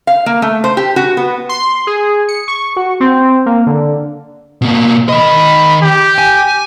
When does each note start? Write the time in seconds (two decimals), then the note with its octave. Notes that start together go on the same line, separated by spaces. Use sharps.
0.07 F5
0.26 A#3
0.42 A3
0.64 C5
0.77 G4
0.96 F#4
1.17 B3
1.49 C6
1.87 G#4
2.28 C#7
2.48 C#6
2.76 F#4
3.00 C4
3.46 A#3
3.67 D3
4.62 B2 A#3
5.09 D#3 D#5 B5
5.82 G4
6.18 G#5